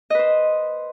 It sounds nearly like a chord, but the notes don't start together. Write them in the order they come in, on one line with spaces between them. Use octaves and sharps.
D#5 B4 C5